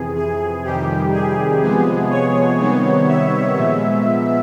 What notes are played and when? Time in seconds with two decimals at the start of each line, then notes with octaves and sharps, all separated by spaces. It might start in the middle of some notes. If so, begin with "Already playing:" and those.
Already playing: F2 C3 E3 G#4
0.17 G#4
0.64 F2 C3 D#3 G3 G4
1.13 G#4
1.62 C3 F3 G#3 B3
2.10 C#5
2.60 C3 D#3 G3 B3
3.08 E5
3.56 A#2 F3 G#3 B3